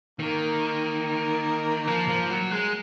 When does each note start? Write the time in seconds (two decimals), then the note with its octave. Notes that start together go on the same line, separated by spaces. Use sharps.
0.20 D#3 A#3
1.88 F3
2.08 F3
2.30 F#3
2.51 G#3